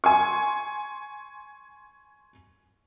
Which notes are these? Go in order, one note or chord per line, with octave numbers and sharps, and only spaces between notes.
G#5 C6 C#6